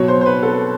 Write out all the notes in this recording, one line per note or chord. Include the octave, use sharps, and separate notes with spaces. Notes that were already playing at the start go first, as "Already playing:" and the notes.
Already playing: B2 F#3 C#5
C5
C5
B4
A4